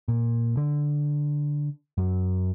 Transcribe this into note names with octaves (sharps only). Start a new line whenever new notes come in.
A#2
D3
F#2